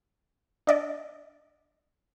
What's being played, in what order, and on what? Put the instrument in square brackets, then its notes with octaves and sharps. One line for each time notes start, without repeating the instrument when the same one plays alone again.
[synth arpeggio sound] D4 D5 D#5